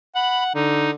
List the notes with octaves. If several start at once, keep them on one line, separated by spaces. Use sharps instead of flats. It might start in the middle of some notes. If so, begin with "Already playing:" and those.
F#5 B5
D3 D#4